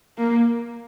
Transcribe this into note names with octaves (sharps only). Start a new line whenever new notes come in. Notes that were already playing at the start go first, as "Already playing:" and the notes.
A#3